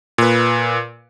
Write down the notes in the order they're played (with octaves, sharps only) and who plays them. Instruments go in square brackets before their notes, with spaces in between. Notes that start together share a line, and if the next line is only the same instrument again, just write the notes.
[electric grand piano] A#2 B4